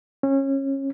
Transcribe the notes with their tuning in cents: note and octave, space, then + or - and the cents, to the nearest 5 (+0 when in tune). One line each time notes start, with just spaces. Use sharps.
C#4 -25